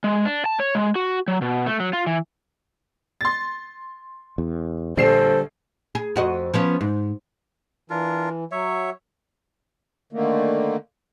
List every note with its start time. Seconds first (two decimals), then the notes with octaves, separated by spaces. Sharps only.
0.04 G#3
0.25 D4
0.46 A5
0.60 C#5
0.75 G#3
0.96 F#4
1.28 F#3
1.42 B2
1.66 A3
1.80 F#3
1.93 F4
2.06 E3
3.21 C6 A6
4.38 E2
4.97 A#1 D3 G3 A4 C5 C7 E7
5.95 G#4
6.16 F2 F#4 D#5
6.54 F3 B3 C#4
6.81 G#2
7.90 E3 D4 F4 A#4
8.51 F#3 C#5 E5
10.13 D3 D#3 A3 A#3